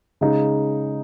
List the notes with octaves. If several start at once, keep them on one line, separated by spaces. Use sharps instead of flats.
C#3 G#3 D#4